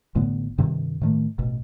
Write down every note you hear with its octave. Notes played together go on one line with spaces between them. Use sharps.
A1 A2 D3 B3
G2 C3 D#3
A2 D#3 A3
A1 B2